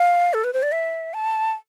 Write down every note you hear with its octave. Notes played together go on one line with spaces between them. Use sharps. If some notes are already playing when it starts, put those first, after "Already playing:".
Already playing: F5
A4
B4
C5
D5
E5
A5